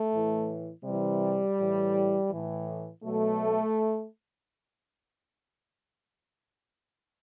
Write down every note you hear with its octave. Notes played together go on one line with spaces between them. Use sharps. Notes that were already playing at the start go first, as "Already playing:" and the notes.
Already playing: A3
A2 E3
C3 E3 G3
A2 E3
A2 E3
B2 F#3 A3